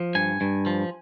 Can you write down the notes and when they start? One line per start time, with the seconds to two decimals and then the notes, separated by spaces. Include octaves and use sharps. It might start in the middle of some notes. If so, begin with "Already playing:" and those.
Already playing: F3
0.15 G2 G#5
0.41 G2
0.66 F3